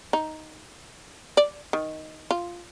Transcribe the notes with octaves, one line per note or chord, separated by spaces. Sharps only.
D#4
D5
D#3
F4